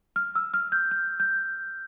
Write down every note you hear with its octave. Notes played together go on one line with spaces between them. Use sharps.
F6
E6
F6
G6
G6
G6